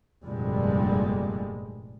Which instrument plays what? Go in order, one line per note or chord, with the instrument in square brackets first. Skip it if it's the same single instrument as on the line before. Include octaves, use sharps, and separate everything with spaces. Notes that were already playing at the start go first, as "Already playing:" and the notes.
[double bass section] F1 G2 A#2 D3 G3 G#3